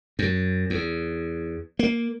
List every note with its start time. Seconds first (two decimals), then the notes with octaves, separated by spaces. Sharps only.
0.19 F#2
0.70 E2
1.79 A#3